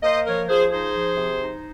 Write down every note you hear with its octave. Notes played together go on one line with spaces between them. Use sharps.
A#3 C5 D#5
F3 A#4 C#5
F3 G#4 C5
D#4 G#4 C5
F3
C3
D#4